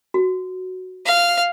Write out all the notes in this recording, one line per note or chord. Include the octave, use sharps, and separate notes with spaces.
F#4
F5